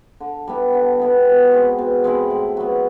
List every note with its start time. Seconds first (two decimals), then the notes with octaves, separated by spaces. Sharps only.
0.20 D3
0.48 G3 B3 E4
0.74 D3
1.00 G3 B3 E4
1.25 B2
1.51 G#3 C4 E4
1.78 B2
2.04 G#3 C4 E4
2.30 A2
2.57 F#3 B3